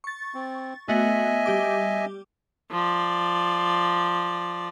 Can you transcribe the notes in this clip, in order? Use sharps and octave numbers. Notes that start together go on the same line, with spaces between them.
C#6 A6
C4
A3 B3 F#4 D#5 E5 G#5
G3 G4 D6
F3 D5